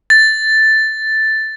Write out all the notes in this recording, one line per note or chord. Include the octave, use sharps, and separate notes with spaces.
A6